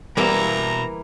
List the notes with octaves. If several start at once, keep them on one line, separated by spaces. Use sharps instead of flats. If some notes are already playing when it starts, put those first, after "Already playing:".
B2 E3 G3 A#3 B3 E4 E5 A#5